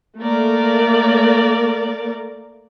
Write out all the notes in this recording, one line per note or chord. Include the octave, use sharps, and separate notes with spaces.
A3 A#3 A#4 D5